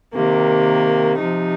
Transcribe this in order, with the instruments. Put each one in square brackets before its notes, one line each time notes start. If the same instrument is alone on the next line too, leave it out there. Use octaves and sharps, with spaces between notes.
[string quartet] C3 D#3 A#3
C3 F3 D#4